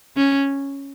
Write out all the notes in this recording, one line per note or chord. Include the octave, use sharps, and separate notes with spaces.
C#4